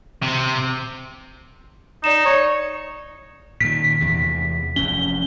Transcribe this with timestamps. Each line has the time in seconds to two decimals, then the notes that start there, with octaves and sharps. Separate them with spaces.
0.22 C3
2.04 D#4 D5 E7
2.26 C#5
3.61 A#2 D#3 B6
4.01 E2 C3
4.76 F1 F#2 C#4 G7